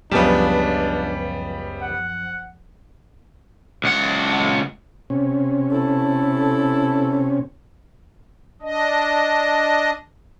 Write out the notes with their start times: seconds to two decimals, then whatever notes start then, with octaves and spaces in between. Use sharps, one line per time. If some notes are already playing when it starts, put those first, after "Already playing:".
0.11 C#2 F#2 C#3 F3 G3 B3 D4 A5
1.82 F#5
3.84 C#2 F#5
5.10 C3 C#4
5.72 E4 A4
8.62 D4 D#5